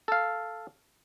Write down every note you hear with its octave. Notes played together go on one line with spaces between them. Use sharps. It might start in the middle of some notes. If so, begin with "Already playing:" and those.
A4 F5